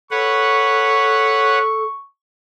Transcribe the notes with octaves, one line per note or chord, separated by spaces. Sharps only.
A4 B4 C#5 F#5 C#6